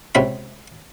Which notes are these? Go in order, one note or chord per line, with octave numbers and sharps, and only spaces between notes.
C#2 C3 C#4 B5